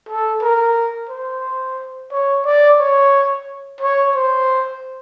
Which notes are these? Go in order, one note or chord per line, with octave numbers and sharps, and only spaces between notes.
A4
A#4
C5
C#5
D5
C#5
C#5
C5